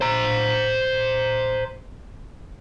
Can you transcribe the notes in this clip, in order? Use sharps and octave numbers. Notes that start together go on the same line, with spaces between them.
C5 A#5